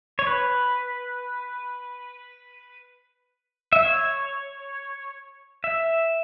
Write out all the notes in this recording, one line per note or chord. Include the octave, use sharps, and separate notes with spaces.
C#5
B4
E5
C#5
E5